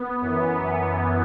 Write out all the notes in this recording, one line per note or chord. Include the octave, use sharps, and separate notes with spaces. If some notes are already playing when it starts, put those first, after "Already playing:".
Already playing: B3
F#2 E3